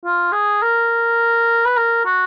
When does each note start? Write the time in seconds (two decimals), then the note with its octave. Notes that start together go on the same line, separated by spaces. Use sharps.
0.05 F4
0.32 G#4
0.62 A#4
1.65 B4
1.77 A#4
2.05 F#4